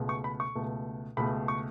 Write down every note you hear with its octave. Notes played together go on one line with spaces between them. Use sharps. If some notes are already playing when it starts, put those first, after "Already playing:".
Already playing: C#2 B2 A3
C#6
B5
C#6
C#2 B2 A3
C#2 B2 A3 B5
C#6